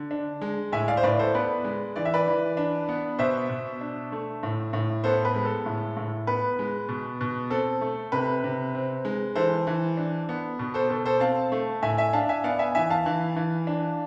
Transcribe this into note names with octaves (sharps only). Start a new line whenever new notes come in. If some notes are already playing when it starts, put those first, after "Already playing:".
Already playing: D3
D4
G#3
A2 E5 G#5
D5 F5
C5
A2 B4 D5
A4 C5
B3 B4 D5
G#3
E3 D5
E5
B4 D5
E3
D4
B3
B2 C5 E5
B2
D4
A3
A2
A2
B3 A4 C5
B4
G#3
A4
A2
A2
B3 B4
G#3
B2
B2
C4 A4
A3
C3 B4
C3
C4
G#3
E3 A4 C5
E3
D4
B3
B2
A4 C5
B2 A4
A4 C5
C4 F5 A5
A3
A2 E5 G#5
E5 G#5
D4 F5 A5
E5 G#5
B3 D5 F5
E5 G#5
E3 E5 G#5
F5 A5
E3
E3
D4